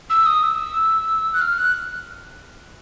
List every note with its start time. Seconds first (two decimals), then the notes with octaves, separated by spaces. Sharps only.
0.10 E6
0.26 D#6
0.43 E6
1.33 F#6
1.41 F6
1.58 F#6